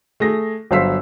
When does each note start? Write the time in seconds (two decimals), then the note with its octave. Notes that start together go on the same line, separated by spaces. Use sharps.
0.20 A3 G#4 A#6
0.71 G1 F#3 C5 F5 E6 B6